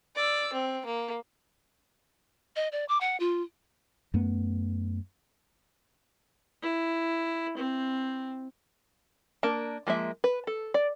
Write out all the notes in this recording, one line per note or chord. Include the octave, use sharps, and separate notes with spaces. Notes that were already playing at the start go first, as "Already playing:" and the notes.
D5 E6
C4
A#3
D#5
D5
D6
F#5
F4
F#2 A3 B3
E4
C4
A#3 D4 A#4 A5
F3 G#3 A#3 E5
B4
A4
D5